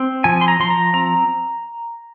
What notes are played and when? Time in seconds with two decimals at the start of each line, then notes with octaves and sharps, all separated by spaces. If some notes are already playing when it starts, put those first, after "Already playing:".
Already playing: C4
0.24 F3 G#5
0.41 C6
0.48 A#5
0.60 F3 C6
0.70 A#5
0.94 C4 A#5